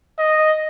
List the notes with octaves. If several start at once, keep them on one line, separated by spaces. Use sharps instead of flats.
D#5